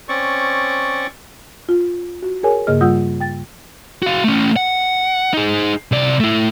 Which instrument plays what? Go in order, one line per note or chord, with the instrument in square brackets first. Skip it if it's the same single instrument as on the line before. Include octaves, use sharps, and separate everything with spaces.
[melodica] C4 C#4 D5 C#6
[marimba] F4
F#4
G#4 A#4 C#5 G#5
G2 C#3 A#3 G#4 D#5 F6
G3 F4 F#5 D#6 E6 G6
G5 A6
[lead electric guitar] F#4 F5
A3 C#4
F#5
D#4 G#4
C3 D5
A3 E4